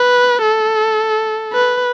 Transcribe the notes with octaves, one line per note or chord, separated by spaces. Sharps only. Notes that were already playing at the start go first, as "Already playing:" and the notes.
Already playing: B4
A4
B4